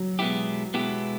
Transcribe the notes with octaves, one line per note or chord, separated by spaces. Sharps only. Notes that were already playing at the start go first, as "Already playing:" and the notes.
Already playing: F#3
B2 G#3 B3 E4 G4
B2 G#3 B3 E4 G4